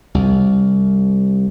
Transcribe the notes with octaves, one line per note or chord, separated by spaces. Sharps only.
C2